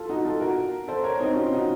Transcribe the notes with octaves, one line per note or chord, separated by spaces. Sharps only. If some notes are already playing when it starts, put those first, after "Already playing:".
Already playing: F4 A4
D#4 F#4
F4 A4
F#4 A#4
A4 C5
A#4 C#5
C4 D#4
C#4 F4
D#4 F#4